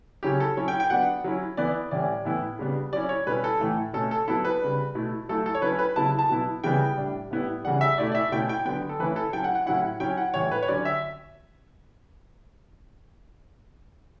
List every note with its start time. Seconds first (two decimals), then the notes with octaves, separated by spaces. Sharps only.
0.23 C#3 F#3 C#4 E4 G4
0.40 A4
0.57 F#3 C#4 E4 C#5
0.68 G5
0.80 G5
0.90 F#3 B3 D4 F#5
1.24 F#3 C#4 E4
1.57 E3 B3 E4 D5
1.91 A2 E3 G3 C#4 D5
2.25 A2 E3 B3 E4
2.59 C#3 G3 B3 D4
2.93 F#3 C#4 E4 D5
3.09 C#5
3.27 B2 G3 C#4 E4 B4
3.44 A4
3.60 A2 E3 A3 E4
3.93 B2 A3 C#4 A4
4.11 A4
4.28 F#3 B3 E4 A4
4.45 B4
4.61 C#3 G3 D4
4.95 B2 A3 E4
5.29 F#3 A3 E4 A4
5.46 A4
5.55 C#5
5.62 F#3 C#4 E4 B4
5.79 B4
5.96 C#3 F#3 B3 E4 A5
6.19 A5
6.29 B2 F#3 B3 E4
6.64 C#3 E3 G3 B3 E4 G5
6.97 A2 G3 D4
7.31 A2 G3 B3 E4
7.64 C#3 E3 G3 D4 F#5
7.81 E5
7.98 B2 A3 E4 D5
8.12 D5
8.15 E5
8.32 B2 A3 C#4 E4 G5
8.49 G5
8.65 D3 F#3 B3 G5
8.89 A4
8.99 E3 A3 C#4 E4 B4
9.16 A4
9.33 F#3 C#4 E4 G5
9.44 F#5
9.55 F#5
9.66 A2 F#3 C#4 E4 F#5
10.00 F#3 C#4 E4 G5
10.17 F#5
10.34 A2 E3 G3 C#5
10.51 B4
10.63 C#5
10.68 D3 F#3 C#4 D5
10.85 E5